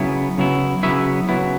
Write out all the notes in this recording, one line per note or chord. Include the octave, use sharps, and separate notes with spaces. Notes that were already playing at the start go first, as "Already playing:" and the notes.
Already playing: C#3 F#3 B3 E4
C#3 F#3 B3 E4
C#3 F#3 B3 E4 E5
C#3 F#3 B3 E4